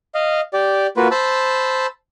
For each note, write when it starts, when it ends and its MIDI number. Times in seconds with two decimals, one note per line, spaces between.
0.14 0.41 75
0.14 0.41 77
0.53 0.87 67
0.53 0.87 74
0.97 1.08 58
0.97 1.08 65
0.97 1.08 66
0.97 1.08 71
1.11 1.86 72
1.11 1.86 81
1.11 1.86 83
1.11 1.86 88